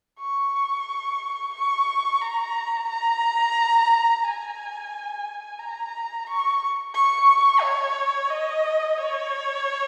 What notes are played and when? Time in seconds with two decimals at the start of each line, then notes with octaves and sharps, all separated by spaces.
0.20 C#6
1.53 C#6
2.21 A#5
2.90 A#5
4.24 G#5
5.59 A#5
6.27 C#6
6.95 C#6
7.62 C#5
8.30 D#5
8.97 C#5